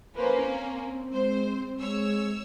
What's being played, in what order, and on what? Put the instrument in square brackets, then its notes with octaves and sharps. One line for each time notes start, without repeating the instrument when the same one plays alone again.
[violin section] A#3 C#4 [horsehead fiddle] B4 C5
[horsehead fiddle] C4
[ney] G#3 [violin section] C5
[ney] G#3 [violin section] C#5 E6